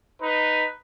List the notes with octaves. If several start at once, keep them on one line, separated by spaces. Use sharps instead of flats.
D#4 B4